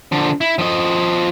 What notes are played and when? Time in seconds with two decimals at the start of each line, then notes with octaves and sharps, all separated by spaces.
0.12 D3 F3
0.41 E4
0.59 F3 D#5